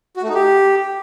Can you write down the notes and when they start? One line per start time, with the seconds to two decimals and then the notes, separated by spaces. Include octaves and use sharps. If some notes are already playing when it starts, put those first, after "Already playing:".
0.16 F#4
0.23 A3
0.29 D#4
0.35 G4